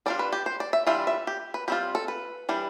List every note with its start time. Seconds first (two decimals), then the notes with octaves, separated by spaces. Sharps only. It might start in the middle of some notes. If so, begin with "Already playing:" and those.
0.06 G3 D4 F4 D5
0.19 B4
0.32 G4
0.46 C5
0.60 D5
0.73 E5
0.87 E3 G3 D4 F4 E5
1.07 E5
1.27 G4
1.54 B4
1.68 G3 C4 F4 G4
1.95 A4
2.08 B4
2.49 E3 G3 D4